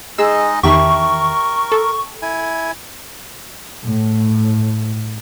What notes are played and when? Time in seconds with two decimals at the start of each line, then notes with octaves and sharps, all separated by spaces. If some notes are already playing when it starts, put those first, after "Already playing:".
0.18 G#3 D#4 G#4 D#5 E6
0.63 E2 D#3 G4 A#4 E5 A5 B5 C#6
1.72 A4
2.22 E4 G#5
3.86 A2